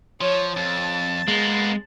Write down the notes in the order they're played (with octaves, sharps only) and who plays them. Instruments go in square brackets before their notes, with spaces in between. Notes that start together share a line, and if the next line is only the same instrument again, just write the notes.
[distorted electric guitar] F3 [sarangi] C#5
[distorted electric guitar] F2 [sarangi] A5
[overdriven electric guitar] G#3 [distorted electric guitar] A#3 B3